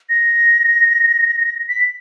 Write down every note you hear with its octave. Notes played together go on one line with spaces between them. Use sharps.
A#6
B6